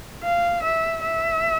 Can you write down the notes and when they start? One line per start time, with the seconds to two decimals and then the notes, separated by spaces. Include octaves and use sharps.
0.23 F5
0.63 E5
1.02 E5